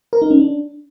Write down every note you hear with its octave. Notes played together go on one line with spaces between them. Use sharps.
A#4
D#4
C#4
D4